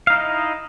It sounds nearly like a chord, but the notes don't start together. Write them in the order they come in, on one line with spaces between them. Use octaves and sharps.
F5 D#4 E4 D#5